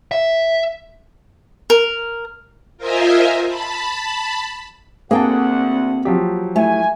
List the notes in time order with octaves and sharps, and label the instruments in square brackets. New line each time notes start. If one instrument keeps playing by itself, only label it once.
[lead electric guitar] E5
[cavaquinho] A#4
[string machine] F4 A#4 C5 D#5 E5 G#5
A5 B5
[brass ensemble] D2 F#5 [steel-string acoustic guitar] A#3 G5 [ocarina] C4 [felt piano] G#4 A5
[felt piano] F3 F#3 G4
[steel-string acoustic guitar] A3 [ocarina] E4 [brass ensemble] G#5